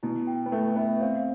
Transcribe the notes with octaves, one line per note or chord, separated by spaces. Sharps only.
B2 E4
G5
B3
A3 B4
B3 E5
C4 F5